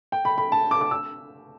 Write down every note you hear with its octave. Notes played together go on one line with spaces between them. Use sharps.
G5
B5
B5
A5
D6
D6
E6